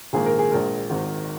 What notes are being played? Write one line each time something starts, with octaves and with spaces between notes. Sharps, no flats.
A#1 G#2 D#3 A#3 G#4
A#4
G#4
A#1 A#2 G#3 A#4
G#1 G#2 D#3